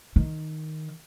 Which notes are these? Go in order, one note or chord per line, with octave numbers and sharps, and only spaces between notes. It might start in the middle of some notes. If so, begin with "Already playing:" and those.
D#3